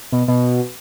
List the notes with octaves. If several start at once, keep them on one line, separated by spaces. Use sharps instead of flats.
B2
B2